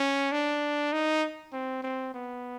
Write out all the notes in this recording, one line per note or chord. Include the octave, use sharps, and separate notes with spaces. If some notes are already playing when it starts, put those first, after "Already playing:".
Already playing: C#4
D4
D#4
C4
C4
B3